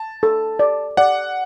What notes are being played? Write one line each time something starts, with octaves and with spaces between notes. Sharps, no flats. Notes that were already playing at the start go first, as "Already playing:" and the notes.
Already playing: A5
A4
D5
D5 F#5